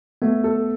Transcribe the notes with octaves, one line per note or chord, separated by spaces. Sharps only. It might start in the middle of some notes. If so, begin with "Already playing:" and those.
A3 B3
A4